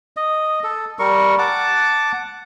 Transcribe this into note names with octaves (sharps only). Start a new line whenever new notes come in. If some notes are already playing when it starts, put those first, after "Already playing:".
D#5
A4
G3 A#4 C#6
F#5 A5 D6